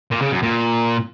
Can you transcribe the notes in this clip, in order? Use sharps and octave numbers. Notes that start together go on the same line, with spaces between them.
A#2
C#3
F#2
A#2